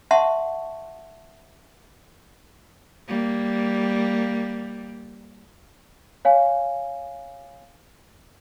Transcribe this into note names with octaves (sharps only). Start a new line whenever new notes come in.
E5 F#5 A5 C6 C#6
G3 A#3
C#5 F5 G#5